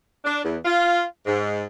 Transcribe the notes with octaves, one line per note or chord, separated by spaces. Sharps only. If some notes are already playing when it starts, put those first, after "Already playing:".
D4
E2
F4
G#2